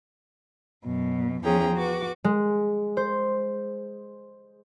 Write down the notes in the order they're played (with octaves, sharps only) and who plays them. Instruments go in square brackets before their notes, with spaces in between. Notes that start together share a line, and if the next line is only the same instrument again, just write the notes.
[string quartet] F#2 B2
E2 F3 C#4 G#4 G5 A#5
F#4 B4 D6
[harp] G#3
C5